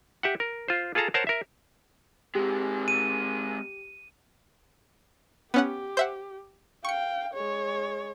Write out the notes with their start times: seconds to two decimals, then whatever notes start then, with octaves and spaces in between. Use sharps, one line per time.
0.23 G4 E5 F#5
0.40 A#4
0.68 F4 C5
0.95 F4 G#4 A4 A5 A#5
1.14 A#4 C5 C#5 F#5 A5 A#5
1.27 A#4 E5
2.35 G#3 C4 G4
2.88 D#7
5.54 B3 C#4 G4 F#5
5.97 C5 E5 F#5
6.85 F5 G5 C#6 C#7
7.33 G#3 C#5